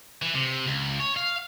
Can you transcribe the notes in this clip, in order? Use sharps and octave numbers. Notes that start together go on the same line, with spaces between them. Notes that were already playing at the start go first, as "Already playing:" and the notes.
E3
C3
C#2
C#5
F5